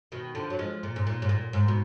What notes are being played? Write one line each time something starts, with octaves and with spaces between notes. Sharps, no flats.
B2 D#3
D3 F3
F#3
F3 G#3
A#2
G#2
A#2
G#2
A#2
G#2
B2